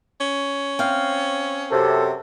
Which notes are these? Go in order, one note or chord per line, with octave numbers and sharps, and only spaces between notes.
C#4
C4 F5
F#2 C3 A4